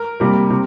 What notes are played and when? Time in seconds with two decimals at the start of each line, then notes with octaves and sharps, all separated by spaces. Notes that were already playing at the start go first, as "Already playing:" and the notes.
Already playing: A#4
0.20 C3 G3 A#3
0.50 C3